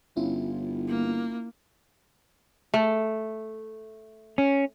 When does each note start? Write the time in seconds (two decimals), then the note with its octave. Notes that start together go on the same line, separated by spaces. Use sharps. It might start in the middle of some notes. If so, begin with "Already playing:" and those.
0.16 G1 C#4 E4 F4
0.89 A#3
2.74 A3
4.38 C#4